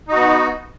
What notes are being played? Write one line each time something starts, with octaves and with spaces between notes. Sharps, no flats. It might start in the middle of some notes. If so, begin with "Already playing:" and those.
B3 D#4 F#4